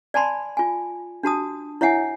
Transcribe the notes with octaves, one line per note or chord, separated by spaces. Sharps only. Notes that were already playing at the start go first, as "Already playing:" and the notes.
D5 G#5 A5 B5 C6
F4 G#5
D4 F#4 A5 D#6
E4 C#5 E5 F#5 G#5